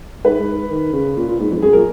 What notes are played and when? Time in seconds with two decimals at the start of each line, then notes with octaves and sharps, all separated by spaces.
0.25 G#2 B4
0.40 G#2
0.71 D#3
0.93 C#3
1.17 A#2
1.28 A#2
1.40 G#2
1.51 F2
1.57 G#2
1.62 F#2 G#4
1.73 A#2 A#4